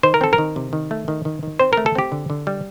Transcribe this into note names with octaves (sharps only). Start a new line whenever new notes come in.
D#3 C5
A#4
C4 A4
A#4
D#3
C3
D#3
A3
D#3
D#3
D#3
C4 C5
A3 A#4
A4
C4 G4
D3
D3
G3